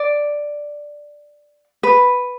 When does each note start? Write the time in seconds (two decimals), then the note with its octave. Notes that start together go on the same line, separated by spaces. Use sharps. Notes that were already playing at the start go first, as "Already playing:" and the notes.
Already playing: D5
1.83 B4